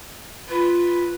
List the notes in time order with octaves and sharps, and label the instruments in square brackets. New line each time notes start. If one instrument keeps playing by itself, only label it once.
[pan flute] F4 [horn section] B4